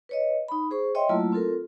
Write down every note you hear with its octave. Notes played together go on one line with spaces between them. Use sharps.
B4 C#5 D#5
D#4 B5
G#4 C5 C#6
C#5 D#5 E5 G5 C6
F#3 A3 A#3 E4 F4 A5
C4 F4 A4 A#4